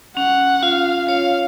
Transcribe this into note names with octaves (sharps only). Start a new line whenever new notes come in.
C#4 F#5
F4 F5
C#5 F5